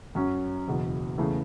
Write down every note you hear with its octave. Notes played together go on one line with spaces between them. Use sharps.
F#2 F#3 C#4
F#1 E2 B2
E2 C#3 E3 A3